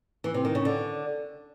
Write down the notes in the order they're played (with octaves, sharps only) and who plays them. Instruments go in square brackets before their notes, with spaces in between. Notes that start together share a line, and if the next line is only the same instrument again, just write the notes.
[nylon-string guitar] E3
C3
D#3
C#3
D3